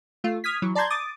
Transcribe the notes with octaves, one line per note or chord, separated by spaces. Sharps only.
A3 F4
D#6 F6 G#6 B6
E3 F#3
D5 A5 A#5 C6 G6 G#6
D6 D#6 A6